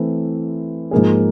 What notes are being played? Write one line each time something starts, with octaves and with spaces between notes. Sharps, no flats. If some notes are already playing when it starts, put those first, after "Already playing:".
Already playing: E3 A3 C4 E4
G#2 F3 A#3 D#4 G#4